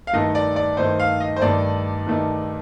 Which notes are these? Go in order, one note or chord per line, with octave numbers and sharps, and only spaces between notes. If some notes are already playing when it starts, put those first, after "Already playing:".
F5
G2 D#3 A3 D#4 D#5
D5
D5
G2 D#3 A3 D#4 C5
F5
D#5
C5
G2 D#3 A3 D#4 D5
G2 D#3 A3 D#4